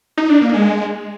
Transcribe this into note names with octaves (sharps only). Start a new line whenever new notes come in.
D#4
D4
A#3
G#3